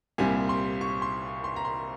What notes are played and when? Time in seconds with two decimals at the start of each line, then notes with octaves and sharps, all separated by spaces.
0.18 C2 A#2 G3 C4 G#5
0.49 C6
0.81 C#6
1.02 C6
1.44 C6
1.56 A#5
1.65 C6